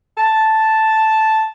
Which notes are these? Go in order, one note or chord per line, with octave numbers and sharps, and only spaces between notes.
A5